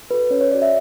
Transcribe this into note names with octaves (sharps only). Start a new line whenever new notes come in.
F#4 A4 B4
C#4 C#5
C#5
F#4 A4 D5
E5